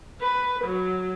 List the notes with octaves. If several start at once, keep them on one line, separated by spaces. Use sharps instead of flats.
B4
F#3